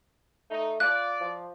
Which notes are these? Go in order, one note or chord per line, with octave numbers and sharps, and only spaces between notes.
A3 D#4
F4 D5 F#6
F3